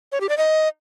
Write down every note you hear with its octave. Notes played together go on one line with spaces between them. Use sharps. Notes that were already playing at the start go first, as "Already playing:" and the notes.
C#5
G4
D5
D#5